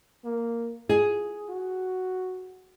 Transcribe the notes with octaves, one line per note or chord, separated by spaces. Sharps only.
A#3
F4 G#4
F#4